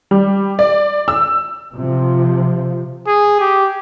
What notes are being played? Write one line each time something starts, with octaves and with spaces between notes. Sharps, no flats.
G3
D5
E6
C3 F3
G#4
G4